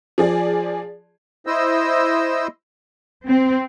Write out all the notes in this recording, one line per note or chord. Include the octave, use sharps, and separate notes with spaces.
F3 G#4 D5
E4 C5 D#5 E6
C4